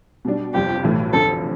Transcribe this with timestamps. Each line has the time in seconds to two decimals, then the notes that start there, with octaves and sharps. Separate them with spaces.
0.25 B2 G3 D4
0.54 G1 F2 C3 G3 G4
0.83 B1 A2 E3 A3
1.13 F1 F2 D3 A4